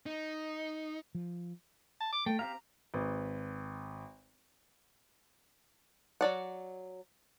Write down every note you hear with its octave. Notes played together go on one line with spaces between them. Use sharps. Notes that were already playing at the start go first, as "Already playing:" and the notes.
D#4
F3
A5
D6
A3 G5
C4 G4 F5 A#5
G#1 B4
F#3 D5 F#5